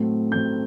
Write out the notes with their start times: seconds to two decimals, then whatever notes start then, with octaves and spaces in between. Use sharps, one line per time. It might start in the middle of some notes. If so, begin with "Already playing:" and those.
Already playing: A2 F#3 A3 C4
0.31 A2 F#3 A3 C4 G6